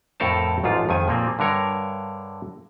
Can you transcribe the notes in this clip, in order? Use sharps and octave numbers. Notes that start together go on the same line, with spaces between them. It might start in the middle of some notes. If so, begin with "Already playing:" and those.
F2 A2 A4 A#4 C5 A5
A1 G#2 F3 F4
F2 D#3 G#5
A#2 F3 A#3 C4
G2 D3 A#4 C#5